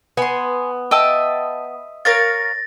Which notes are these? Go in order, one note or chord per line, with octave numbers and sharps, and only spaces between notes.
B3 G#5 C6
D#5 E5 G5 A5 E6
A#4 C#5 F5 A6 A#6